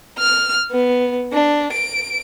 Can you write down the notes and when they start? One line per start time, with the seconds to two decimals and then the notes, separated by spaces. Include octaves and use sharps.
0.18 F6
0.71 B3
1.32 D4
1.72 D7